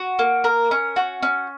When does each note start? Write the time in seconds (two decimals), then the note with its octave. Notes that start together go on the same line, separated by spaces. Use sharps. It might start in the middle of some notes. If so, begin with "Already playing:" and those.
Already playing: F#4
0.19 A#3
0.44 A#4
0.71 C#4
0.96 F#4
1.23 C#4